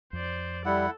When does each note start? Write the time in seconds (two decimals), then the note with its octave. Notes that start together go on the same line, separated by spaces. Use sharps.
0.13 F2 C5 D5
0.65 G3 E4 A4 F#5